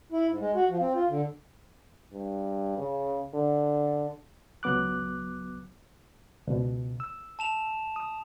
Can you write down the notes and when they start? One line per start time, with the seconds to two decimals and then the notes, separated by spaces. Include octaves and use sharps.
0.12 E4
0.28 G#2
0.40 G#3
0.55 F#4
0.69 F3
0.81 C4
0.94 F4
1.09 D3
2.13 G2
2.78 C#3
3.34 D3
4.63 C#2 F#3 B3 D6 F#6
6.47 C#2 B2
7.00 E6
7.39 A5 E7 F7
7.96 D#6